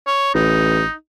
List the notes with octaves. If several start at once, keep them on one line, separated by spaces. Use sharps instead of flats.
C#5
A1 D#4